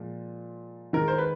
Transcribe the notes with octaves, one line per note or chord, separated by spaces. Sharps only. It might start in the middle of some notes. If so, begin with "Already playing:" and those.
Already playing: A#2 F3 G#3
D#3 G#3 A#4
C5
B4